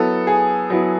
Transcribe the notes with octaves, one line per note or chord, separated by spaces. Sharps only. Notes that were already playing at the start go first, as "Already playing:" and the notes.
Already playing: F#3 B3 E4 A4
G#4
F#3 B3 E4